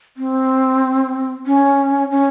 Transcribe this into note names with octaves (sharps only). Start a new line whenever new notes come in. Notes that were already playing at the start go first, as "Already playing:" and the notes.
C4
C#4
C#4